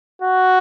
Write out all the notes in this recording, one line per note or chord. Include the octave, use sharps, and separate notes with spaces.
F#4